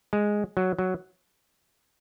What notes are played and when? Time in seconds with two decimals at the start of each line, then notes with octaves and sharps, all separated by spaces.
0.13 G#3
0.57 F#3
0.79 F#3